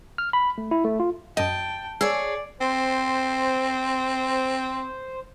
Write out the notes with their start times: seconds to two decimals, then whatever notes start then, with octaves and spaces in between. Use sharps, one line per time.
0.18 F6
0.33 B5
0.58 A3
0.71 E4
0.84 A3
1.00 F4
1.37 F#2 D#5 G5 A5
2.01 G#4 C#5 D5 E6
2.61 C4 C5